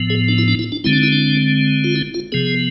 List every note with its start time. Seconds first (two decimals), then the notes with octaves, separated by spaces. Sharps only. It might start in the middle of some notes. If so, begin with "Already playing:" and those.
Already playing: A2 F3 B3
0.10 G#4
0.28 D4
0.38 E4
0.48 D4
0.59 E4
0.72 D4
0.84 D3 G#3 C4 E4
0.93 D4
1.03 E4
1.12 D4
1.84 F4
1.96 E4
2.14 F4
2.32 C3 F3 B3 G#4